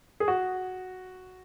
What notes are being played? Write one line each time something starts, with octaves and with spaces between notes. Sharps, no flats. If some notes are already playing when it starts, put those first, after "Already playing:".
G#4
F#4